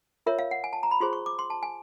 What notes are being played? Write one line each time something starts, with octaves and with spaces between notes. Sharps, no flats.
F4 A#4 C#5 E5
F5
F#5
G#5
A5
A#5
B5
F4 G#4 C5 C6
C#6
D6
C6
A5
G#5